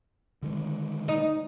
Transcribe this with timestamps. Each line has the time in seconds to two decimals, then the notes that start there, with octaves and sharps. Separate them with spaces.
0.42 D3 D#3 G#3
1.08 D#4